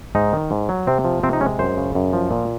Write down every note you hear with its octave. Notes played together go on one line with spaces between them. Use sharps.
G#2 D#4
D#3
G#2
F#3
C3 C4
F3
C3 C4
D#4
G#3 C#4
F#2 C5
C#3
F#2
F3
A#2